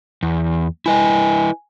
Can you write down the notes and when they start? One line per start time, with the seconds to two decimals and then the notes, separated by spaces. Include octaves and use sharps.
0.23 E2
0.86 E4 B4 D#5 G#5